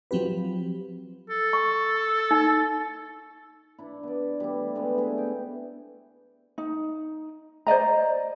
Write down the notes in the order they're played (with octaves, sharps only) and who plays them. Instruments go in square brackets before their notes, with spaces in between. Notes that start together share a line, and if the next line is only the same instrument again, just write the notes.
[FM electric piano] F3 F#3 C4 G4 B4
[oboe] A4
[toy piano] C#6
D#4
[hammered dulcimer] D4 E4
B3 D5
G3 A3 B3 E4
D3 G#3 B3 C4
A3 B3 E4 G#4
G5
[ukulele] D#4
C5 D5 D#5 A#5